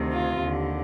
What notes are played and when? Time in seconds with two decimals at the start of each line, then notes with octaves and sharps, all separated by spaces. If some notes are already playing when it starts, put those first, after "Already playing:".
Already playing: D2 C3 D#3
0.13 F4
0.43 D#2 D3